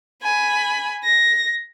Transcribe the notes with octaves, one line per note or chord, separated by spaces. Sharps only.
G#5 B5
A#6